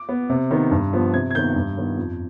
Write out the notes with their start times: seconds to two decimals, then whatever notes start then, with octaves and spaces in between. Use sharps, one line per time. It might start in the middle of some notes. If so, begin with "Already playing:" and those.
Already playing: D6
0.09 B3
0.30 C3
0.50 D#3 B3
0.71 G2
0.93 F3 B3
1.14 C3 G#6
1.31 G#6
1.35 D#3 B3 G6
1.56 G2
1.77 D#3 B3
1.97 F2